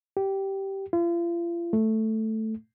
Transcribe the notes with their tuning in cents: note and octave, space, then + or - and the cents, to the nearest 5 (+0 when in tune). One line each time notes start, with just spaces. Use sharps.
G4 -10
F4 -40
A3 +0